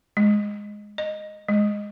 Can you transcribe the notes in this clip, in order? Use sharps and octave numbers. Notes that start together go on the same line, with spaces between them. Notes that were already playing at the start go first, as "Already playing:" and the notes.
G#3
D#5
G#3